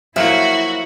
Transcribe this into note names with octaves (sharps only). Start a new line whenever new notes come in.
F3 F#3 A#3 E4 F#4 E5